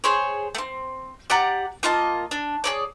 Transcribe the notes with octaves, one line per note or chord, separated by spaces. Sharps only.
G#4 C5 C#5
A3 C4
G4 D5 F#5 A#5
A#3 F4 D#5 A5
D4
G#4 C#5 D5